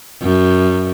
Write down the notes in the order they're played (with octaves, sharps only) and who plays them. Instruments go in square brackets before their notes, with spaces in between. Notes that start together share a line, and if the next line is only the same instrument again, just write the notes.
[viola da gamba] F#2